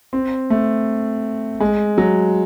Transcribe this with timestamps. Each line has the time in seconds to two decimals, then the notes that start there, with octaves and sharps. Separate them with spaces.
0.13 C4
0.50 A3
1.60 G#3
1.98 F#3